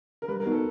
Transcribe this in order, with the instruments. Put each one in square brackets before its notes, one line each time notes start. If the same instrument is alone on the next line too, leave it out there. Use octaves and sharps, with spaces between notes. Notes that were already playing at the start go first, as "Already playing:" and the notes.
[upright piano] A#4
[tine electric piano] G3 [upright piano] B4
[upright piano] A#4
[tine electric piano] B3 D#4 F#4
[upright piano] A4